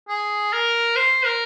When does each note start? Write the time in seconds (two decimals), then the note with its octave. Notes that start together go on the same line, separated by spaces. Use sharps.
0.08 G#4
0.53 A#4
0.96 C5
1.25 A#4